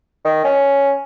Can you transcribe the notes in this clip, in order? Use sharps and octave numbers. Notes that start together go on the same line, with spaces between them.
D#3
C#4